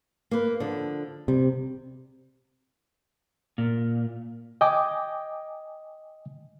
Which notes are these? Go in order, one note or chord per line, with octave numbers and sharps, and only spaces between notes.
A#3 B4
D3 F3
C3 G3
A#2
D#5 G5 G#5 D6